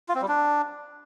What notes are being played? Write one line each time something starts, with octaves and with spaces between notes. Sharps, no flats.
F4
C4
G3
D4